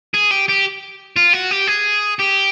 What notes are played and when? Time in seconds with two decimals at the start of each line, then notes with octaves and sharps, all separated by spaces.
0.14 G#4
0.31 G4
0.48 G4
1.16 F4
1.33 F#4
1.51 G4
1.67 G#4
2.19 G4